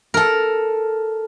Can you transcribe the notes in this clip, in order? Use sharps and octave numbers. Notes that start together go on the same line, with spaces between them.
A4 A#4